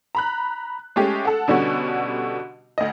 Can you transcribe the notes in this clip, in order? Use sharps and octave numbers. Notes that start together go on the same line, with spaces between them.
A#5 B5 F#6
G#3 A3 C#4 G4
A4 F#5
B2 D3 G3 C#4 F#4
D2 D#5